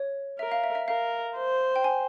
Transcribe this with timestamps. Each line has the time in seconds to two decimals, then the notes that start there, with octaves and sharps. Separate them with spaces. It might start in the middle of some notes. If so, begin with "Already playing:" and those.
Already playing: C#5
0.39 A#4 E5
0.52 F5
0.64 E5
0.75 E5
0.88 A#4 F5
1.36 C5
1.76 G5
1.84 G#5